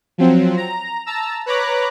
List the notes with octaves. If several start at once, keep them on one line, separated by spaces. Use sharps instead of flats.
F3 F#3 C4
A#5
A5 A#5 E6
B4 C#5 A#5 B5 D6 F#6